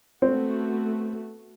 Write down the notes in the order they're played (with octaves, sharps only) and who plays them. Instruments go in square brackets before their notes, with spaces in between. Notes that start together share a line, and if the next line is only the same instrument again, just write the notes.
[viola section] A3 B3 F#4 [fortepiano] C4